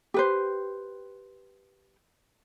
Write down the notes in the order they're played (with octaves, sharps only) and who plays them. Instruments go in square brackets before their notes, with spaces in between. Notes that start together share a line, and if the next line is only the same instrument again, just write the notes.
[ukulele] G4 B4 C5